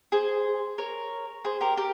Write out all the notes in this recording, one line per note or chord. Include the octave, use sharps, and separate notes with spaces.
G#4 C5
A#4 C#5
G#4 C5
G4 A#4
G4 A#4